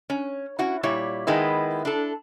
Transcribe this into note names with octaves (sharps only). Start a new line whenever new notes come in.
C#4
C#4 E4 F#4
A#2 G3 E4 C#5
D#3 G#3 B3 E4
D4 A4